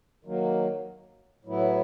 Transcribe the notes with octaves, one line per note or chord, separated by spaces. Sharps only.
D#3 F#3 A#3
A2 F#3 B3 E4